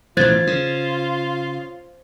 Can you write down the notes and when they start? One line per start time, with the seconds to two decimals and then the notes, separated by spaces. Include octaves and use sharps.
0.17 A1 B2 E3 F4 C5 G#6 A6
0.47 C#3